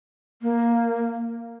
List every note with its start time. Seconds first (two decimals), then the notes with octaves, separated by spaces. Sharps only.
0.42 A#3